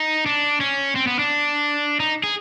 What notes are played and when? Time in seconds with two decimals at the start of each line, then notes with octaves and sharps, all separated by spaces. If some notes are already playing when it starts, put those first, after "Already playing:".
Already playing: D#4
0.26 D4
0.61 C#4
0.96 C4
1.07 B3
1.19 D4
2.00 D#4
2.24 G#4